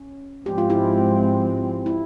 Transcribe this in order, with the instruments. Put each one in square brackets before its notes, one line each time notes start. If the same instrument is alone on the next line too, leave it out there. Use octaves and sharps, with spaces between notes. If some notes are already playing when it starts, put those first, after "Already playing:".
Already playing: [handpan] C#4
[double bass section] G#2 F3 G#3 C4 [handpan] G4
[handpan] F4
E4 G4
E4